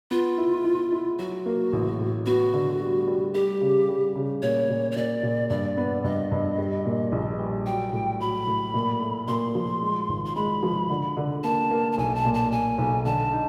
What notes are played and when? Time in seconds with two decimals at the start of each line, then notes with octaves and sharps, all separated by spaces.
0.11 B3 F4
0.38 E4
0.65 E4
0.92 E4
1.19 F#3 F#4
1.46 A#3
1.73 A1
2.00 A2
2.26 B3 F#4
2.54 D3
2.81 G3
3.08 G3
3.35 G3 G4
3.61 C#3
3.89 G3
4.15 C#3
4.42 A#2 C#5
4.69 A#2
4.92 C#5
4.96 A#2 D5
5.23 A#2
5.50 G2 D5
5.77 B3
6.04 G2 D#5
6.31 G2
6.58 G3
6.85 A#2
7.12 A#1
7.39 G3
7.66 F#3 G5
7.93 A2
8.20 F#3 B5
8.47 A2
8.74 A#2
9.01 A3
9.28 A#2 C6
9.55 F3
9.82 G#3
10.09 G#1
10.25 C6
10.36 G#3 B5
10.63 F3
10.90 D3
11.17 D3
11.44 A#3 A5
11.71 A#3
11.92 A5
11.98 B1 G#5
12.15 A5
12.25 A#2
12.34 A5
12.52 A#2 G#5
12.78 B1
13.05 D3 A5
13.32 D#4